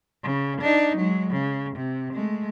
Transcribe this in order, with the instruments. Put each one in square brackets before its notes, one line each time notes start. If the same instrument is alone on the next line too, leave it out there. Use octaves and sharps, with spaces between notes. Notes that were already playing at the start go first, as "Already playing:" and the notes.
[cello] C#3
D4 D#4
F#3 G#3
C#3
C3
G#3 A3